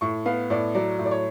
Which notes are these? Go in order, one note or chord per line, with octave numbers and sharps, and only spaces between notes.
A2 C#6
B3 F5
A2 D5
F#3 D5
A2
D5
C#5